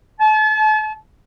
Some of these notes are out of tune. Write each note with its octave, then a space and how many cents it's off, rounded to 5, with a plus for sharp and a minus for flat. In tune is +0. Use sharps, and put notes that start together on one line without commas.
A5 -40